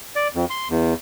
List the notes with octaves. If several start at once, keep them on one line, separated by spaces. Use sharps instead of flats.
D5
F2
C6
E2